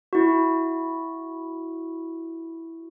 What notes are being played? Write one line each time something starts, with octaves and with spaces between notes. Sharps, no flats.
E4 F#4